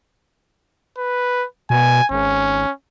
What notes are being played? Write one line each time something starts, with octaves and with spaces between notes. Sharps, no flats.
B4
B2 G#5
G#1 C#4